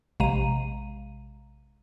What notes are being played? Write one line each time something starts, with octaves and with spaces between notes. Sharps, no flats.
A#1 C3 G#3 F5 A#5 D#7